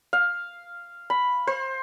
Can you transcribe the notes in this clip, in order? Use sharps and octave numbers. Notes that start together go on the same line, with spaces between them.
F5
B5
C5